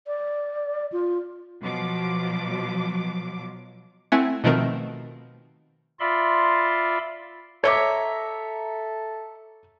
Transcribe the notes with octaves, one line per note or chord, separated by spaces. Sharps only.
D5
F4
B2 F3 F#3 D6
A3 C4 E4 E5 F#5 G#5
B2 D#3 F3 A3 C4 A#4
F4 D5 E5 B5 C6
A4 C#5 D#5 E5 A#5 D6